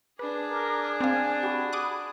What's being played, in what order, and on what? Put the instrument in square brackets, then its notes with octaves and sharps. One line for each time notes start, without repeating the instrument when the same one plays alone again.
[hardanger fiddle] D4 G#4 [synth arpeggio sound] B4 [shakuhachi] D6
[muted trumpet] A#4
[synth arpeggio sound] C4 F5 [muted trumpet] G#5
[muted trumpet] F#4 [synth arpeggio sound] G4 [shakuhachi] B5
[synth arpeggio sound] D6 D#6 F#6